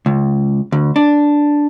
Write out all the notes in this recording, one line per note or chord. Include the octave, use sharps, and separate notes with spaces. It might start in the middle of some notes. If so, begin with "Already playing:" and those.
C#2
D2
D4